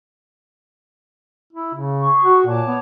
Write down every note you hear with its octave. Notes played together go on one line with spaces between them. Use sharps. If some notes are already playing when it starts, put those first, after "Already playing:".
E4
C#3
G#4 C#6
F#4
A#2 C#5 A5 D6
B3